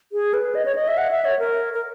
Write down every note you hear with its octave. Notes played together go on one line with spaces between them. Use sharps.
G#4
B4
D#5
C#5
D#5
E5
F#5
E5
C#5
A#4
A#4